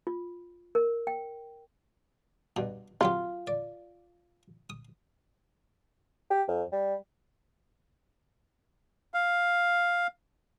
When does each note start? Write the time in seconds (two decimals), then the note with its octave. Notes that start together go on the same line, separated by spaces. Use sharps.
0.07 F4
0.75 A#4
1.07 G5
2.56 G2 B2
3.01 C3 F#3 F4 G4
3.47 D5
4.70 D#6
6.30 G4
6.48 F2
6.72 G3
9.14 F5